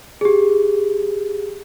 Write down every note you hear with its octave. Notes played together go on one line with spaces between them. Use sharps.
G4 G#4